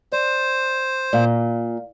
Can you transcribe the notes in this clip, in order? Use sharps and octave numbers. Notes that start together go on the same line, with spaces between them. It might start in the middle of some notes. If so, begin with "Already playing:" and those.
C5 D5
A#2 D5 F5